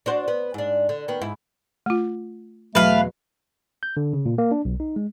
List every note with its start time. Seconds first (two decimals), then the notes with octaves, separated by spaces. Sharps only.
0.06 D4 F#4 C5
0.28 B3
0.54 G#2 D4
0.89 D3
1.08 D#3 B3
1.21 G#2 E4
1.86 A3 F4
2.75 E2 B2 F#3 A3 B4 F5
3.83 G6
3.97 D3
4.13 C#3
4.26 A#2
4.38 A#3
4.51 D4
4.65 B1
4.80 D#4
4.96 G#3